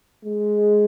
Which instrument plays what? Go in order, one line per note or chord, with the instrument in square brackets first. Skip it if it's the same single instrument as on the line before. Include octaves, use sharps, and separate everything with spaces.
[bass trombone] G#3